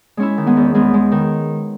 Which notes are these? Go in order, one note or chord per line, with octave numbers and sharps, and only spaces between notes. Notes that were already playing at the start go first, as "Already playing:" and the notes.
G#3 C#4 E4
D#3
G#3 B3
E2
E2 G#3 B3
G#3
D#3